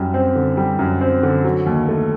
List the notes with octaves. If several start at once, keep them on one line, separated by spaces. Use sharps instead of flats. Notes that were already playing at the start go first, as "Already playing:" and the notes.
Already playing: F#2 G3
C4
D3
G3
F#2
C4
D3
F#3
D#2
A3